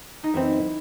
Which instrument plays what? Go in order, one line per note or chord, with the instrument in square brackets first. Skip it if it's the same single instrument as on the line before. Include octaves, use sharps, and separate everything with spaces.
[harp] D#4
[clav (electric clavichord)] F#2 E3 C4 [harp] E4